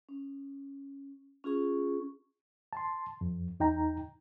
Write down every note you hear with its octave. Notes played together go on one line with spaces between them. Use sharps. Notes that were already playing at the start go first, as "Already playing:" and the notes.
C#4
C#4 F4 G#4 C#6
A5 C6
F2
E2 D#4 G5 A#5